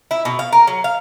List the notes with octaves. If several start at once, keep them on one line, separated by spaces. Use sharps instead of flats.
E4
B2
F5
A#4
F#3
F5